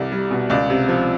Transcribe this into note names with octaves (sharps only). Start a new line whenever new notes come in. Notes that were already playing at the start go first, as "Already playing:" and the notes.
Already playing: C2 G3 D5
G3
B2
C#2 D5
C3
F3